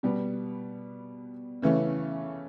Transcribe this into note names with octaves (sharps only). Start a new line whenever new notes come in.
B2 G3 B3
C#3 E3 A3 C#4